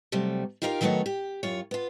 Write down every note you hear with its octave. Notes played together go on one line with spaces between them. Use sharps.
C3 F#3 G3 A3
D#4 F4 G4 A#4 D#5 F5
D#3 F#3 A3 B3 D#4 C#5
G4
F#2 F4 C#5
B3 F4